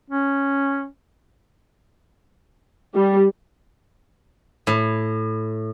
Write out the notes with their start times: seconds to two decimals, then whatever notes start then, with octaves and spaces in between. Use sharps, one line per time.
0.10 C#4
2.95 G3
4.67 A2